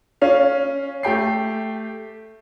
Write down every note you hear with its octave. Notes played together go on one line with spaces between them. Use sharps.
C#4 F5
A3 G4 G5 C7